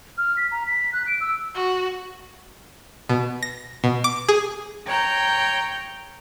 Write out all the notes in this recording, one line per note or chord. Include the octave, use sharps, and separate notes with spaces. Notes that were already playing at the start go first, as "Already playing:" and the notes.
F6
B6
A#5
B6
F#6
D7
E6
F#4
B2
A#6
B2
D6
G#4
C#5 G5 A#5 G6